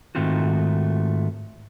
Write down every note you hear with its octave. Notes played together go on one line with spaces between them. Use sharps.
G#2 D#3 A3 C4 F4 F#4